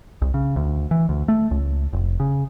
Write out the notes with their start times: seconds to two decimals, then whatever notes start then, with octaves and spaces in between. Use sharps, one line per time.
0.22 C2
0.34 C#3
0.56 D2
0.91 E3
1.09 D2
1.28 A3
1.51 C#2
1.93 F1
2.20 C#3